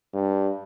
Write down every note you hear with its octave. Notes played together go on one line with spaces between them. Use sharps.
G2